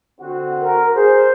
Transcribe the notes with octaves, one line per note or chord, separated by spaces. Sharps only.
D3 C4 F#4
A#4
G#4 C5